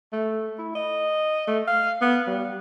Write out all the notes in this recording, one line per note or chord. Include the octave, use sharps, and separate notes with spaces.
A3
E4
D#5
A3
F5
B3
G3